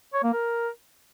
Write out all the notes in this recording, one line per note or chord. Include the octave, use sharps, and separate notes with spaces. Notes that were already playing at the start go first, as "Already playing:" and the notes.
C#5
A#3
A#4